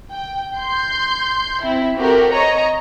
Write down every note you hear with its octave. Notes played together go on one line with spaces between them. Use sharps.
G5
C6 G6
C4 E4
C4 F#4 G4 A4 A#4
C#5 D#5 A#5 C#6